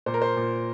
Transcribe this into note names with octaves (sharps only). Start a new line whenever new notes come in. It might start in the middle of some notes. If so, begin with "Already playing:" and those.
A#2 C5
A#4
C5
A#2